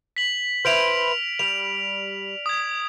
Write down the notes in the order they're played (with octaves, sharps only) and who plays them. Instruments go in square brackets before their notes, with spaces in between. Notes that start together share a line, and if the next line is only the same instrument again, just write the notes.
[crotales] B6 F#7
[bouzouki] E4 B4 C5 [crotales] F6 D7 F7
[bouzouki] G3 [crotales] F7
[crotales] D#6 G#6